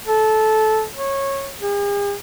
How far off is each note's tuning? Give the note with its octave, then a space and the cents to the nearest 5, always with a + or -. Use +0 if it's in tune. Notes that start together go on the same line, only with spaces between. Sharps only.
A4 -15
C#5 -15
G#4 -45